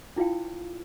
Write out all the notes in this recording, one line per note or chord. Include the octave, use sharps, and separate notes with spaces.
D4 E4 F4 F5 G5